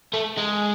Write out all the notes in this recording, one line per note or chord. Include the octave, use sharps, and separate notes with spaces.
A3
G#3